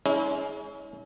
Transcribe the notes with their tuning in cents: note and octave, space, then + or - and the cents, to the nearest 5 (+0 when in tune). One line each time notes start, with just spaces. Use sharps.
G#3 +15 C#4 +25 E4 -40